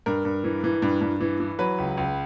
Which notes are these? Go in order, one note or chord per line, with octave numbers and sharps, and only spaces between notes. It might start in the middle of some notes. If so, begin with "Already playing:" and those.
G2 A#4
G2
E3
E3
G2
G2
E3
E3
F#3 B4
C#2
C#2